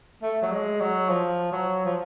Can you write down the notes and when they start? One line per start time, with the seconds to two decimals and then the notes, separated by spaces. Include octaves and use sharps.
0.22 A3
0.42 F#3
0.52 G#3
0.80 F#3
1.09 F3
1.52 F#3
1.85 F3